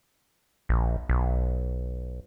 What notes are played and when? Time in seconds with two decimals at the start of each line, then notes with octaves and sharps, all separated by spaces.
0.69 A#1
1.09 B1